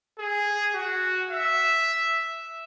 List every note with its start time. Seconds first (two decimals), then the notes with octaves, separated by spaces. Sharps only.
0.19 G#4
0.74 F#4
1.30 E5